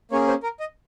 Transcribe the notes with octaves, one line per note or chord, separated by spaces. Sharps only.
A#3 C#4 G#4 C#5
C5
A#4
D#5